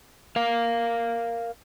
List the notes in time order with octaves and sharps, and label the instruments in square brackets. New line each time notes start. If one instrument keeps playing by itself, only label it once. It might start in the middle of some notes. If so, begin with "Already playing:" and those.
[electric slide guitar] A#4 F5